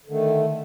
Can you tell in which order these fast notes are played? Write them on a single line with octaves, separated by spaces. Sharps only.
D3 D#3 A3